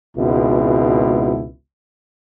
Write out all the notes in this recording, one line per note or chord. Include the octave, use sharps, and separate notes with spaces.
G#1 C#2 B2 E4